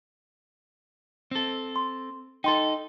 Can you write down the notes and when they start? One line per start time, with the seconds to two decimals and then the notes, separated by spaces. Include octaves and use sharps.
1.31 C4 A4
1.76 C6
2.44 D#4 A4 G5 C6